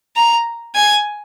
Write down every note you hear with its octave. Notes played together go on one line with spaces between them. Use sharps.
A#5
G#5